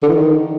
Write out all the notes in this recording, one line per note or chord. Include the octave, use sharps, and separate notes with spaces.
D3
E3
D#3